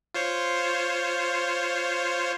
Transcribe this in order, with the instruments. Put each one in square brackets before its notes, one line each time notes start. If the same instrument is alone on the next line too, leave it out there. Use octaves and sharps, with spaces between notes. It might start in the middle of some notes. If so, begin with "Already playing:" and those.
[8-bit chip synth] F4 C5 C#5